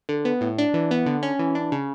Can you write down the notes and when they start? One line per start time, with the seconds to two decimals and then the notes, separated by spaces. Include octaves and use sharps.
0.09 D3
0.25 B3
0.41 A2
0.58 D4
0.74 E3
0.91 B3
1.06 D3
1.23 C#4
1.39 E3
1.55 D4
1.72 C#3